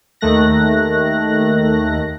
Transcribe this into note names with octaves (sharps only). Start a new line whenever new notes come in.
D#2 D#3 A3 F#6 A#6